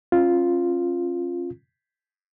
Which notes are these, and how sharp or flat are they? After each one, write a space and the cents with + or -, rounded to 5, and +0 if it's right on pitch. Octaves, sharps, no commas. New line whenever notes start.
C#4 -35 F4 +0